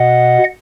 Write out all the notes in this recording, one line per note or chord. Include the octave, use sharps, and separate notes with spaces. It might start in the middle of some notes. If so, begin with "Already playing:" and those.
Already playing: B2 D#5 F#5